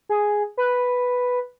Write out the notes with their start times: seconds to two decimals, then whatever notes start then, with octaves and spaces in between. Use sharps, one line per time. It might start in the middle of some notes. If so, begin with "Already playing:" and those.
0.09 G#4
0.57 B4